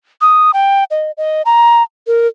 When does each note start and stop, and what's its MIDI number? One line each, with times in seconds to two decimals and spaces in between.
0.21 0.51 87
0.54 0.84 79
0.91 1.11 75
1.17 1.42 75
1.45 1.83 82
2.07 2.27 70